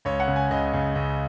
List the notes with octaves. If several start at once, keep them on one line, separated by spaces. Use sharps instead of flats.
C#2 C#5
F#5
C#3
G#5
C#2 D#5
C#3
C#2